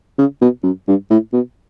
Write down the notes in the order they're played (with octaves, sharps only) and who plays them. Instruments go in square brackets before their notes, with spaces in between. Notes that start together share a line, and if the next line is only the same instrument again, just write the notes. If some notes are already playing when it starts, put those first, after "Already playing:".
[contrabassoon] C#3
B2
F#2
G2
A2
B2